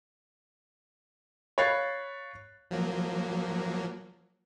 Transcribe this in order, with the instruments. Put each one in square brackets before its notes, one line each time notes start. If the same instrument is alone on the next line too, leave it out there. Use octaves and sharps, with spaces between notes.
[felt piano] C#5 F5 B5 F#6 A6 C7
[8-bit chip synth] F3 F#3 A#3